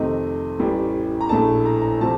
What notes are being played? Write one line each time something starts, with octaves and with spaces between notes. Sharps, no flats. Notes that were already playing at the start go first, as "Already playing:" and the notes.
Already playing: F2 C3 D#3 A3 D#5
A1 A2 G3
A#5
A#1 A2 A3 A5
A#5
A#5
C3 F3 A3 A5